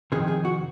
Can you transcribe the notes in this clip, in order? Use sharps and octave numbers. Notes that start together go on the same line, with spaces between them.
F2 C3 D#3 G#4
G#4
F#4